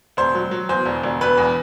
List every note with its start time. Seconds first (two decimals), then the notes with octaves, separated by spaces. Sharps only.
0.17 E1 C5
0.35 F#3
0.51 F#3
0.69 E2 C5
0.86 E1
1.03 E1
1.21 E1 B4
1.38 E2